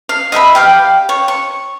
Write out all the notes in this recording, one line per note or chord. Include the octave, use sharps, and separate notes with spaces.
F5
D#5 E5 G5 B5
G4 F5 G5
C#5
C#6